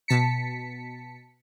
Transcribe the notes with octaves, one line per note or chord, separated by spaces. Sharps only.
B2 A5 B6 C#7